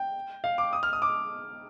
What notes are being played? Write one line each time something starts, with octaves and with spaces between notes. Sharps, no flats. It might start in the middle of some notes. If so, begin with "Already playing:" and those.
Already playing: G5
F5
D6
D#6
F6
D#6
D6